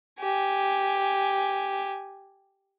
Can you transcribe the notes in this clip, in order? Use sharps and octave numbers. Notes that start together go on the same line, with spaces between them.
G4 G#5